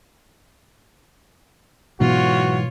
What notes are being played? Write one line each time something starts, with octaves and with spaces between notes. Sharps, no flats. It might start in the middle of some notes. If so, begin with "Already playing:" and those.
G#2 B2 E3 F#3 F4 F#4 C#5